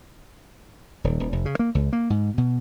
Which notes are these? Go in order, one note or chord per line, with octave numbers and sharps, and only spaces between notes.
D#1
D#1
F1
C#3
A#3
C#2
A#3
G#2
B2